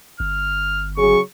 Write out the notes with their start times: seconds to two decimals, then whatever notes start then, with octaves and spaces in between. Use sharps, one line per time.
0.20 G1 F6
0.97 C#3 F#3 G#4 C#6